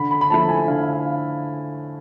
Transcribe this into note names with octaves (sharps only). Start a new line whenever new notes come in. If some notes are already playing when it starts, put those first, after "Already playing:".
Already playing: D3 B5
B5
B5
F3 A3 E4 A5
G#5
D3 F5
F5